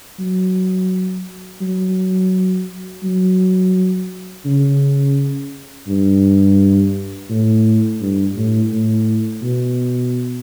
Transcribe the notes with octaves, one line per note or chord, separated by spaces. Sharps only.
F#3
F#3
F#3
C#3
G2
A2
G2
A2
A2
B2